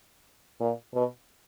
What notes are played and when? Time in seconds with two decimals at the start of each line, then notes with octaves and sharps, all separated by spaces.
0.60 A#2
0.94 B2